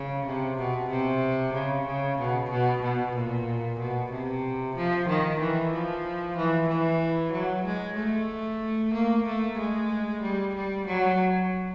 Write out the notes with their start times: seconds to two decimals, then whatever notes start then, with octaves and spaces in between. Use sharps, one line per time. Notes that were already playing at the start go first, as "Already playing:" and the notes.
Already playing: C#3
0.26 C3
0.58 B2
0.90 C3
1.54 C#3
1.86 C#3
2.19 B2
2.50 B2
2.82 B2
3.15 A#2
3.79 B2
4.12 C3
4.76 F3
5.08 D#3
5.40 E3
5.73 F3
6.37 E3
6.68 E3
7.32 F#3
7.65 G#3
7.97 A3
8.94 A#3
9.26 A3
9.58 G#3
10.22 G3
10.55 G3
10.86 F#3